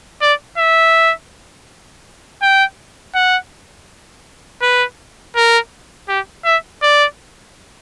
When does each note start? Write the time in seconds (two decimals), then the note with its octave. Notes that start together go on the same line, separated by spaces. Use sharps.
0.22 D5
0.58 E5
2.42 G5
3.15 F#5
4.62 B4
5.36 A#4
6.09 G4
6.45 E5
6.83 D5